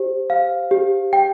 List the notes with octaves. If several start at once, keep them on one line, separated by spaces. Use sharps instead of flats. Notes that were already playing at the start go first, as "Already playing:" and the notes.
Already playing: G4 C5
F5
G4
G5